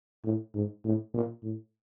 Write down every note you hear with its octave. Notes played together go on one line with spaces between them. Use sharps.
A2
G#2
A2
A#2
A2